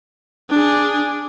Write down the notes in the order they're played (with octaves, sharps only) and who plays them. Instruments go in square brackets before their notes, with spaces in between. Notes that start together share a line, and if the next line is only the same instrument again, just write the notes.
[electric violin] D4 G#4